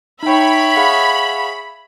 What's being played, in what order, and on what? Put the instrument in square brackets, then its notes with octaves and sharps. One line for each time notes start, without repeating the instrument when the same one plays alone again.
[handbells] D#4 G5 [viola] C#5 E5 [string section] B5
[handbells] G#4 F5 F#5